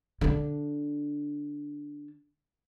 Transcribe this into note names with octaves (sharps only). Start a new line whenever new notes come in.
D3 D4